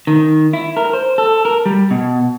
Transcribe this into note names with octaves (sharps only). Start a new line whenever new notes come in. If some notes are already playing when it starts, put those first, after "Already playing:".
D#3
E4
A#4
C5
A4
A#4
G3
B2